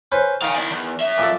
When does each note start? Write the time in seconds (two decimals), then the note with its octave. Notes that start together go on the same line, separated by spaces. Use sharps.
0.12 C#4 B4 C5
0.42 D#3 F5 G#5 A#5
0.55 E4 D5
0.71 E2
1.00 F#2 E5
1.18 A#2 A4